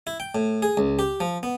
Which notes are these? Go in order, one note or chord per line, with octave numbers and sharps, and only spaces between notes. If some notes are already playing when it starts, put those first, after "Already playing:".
E4
G5
A2
G#4
C#2
G4
F3
B3